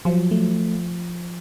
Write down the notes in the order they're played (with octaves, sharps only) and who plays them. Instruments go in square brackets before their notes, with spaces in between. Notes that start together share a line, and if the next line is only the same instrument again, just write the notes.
[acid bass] F3 [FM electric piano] F#3
[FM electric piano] A3